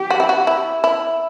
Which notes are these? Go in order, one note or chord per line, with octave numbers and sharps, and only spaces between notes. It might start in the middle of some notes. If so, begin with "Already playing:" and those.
Already playing: G4
F#4
E4
F#4
E4
E4